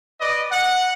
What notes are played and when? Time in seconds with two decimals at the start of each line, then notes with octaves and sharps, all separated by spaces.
0.20 B4 D5 D#5
0.51 F#5